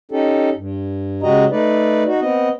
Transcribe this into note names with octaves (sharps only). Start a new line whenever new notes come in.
C#4 D#4 G4 A4
G2
C#3 G#3 F#4 G4 D#5 A#5
A3 D#4 B4 D5
D#4 F#4
B3 C4 D#5